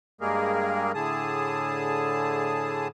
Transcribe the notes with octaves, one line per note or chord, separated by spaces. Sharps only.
G2 G3 G#3 A#3 G#4 A#4
A2 D3 G#4 A5 D#6